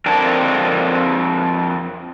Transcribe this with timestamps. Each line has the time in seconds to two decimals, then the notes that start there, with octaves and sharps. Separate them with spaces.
0.06 F2 C4 D4 A#4 A5